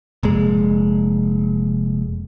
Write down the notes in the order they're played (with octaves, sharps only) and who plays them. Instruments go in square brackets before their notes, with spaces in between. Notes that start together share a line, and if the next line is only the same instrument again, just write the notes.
[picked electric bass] F1 A#2 G#3